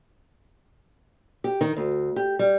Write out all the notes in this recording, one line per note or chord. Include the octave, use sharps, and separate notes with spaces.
G4
D#3
D2
G4
G3